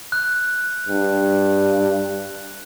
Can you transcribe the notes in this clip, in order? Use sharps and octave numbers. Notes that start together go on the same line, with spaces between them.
F#6
G2